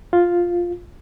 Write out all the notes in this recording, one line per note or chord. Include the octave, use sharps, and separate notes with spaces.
F4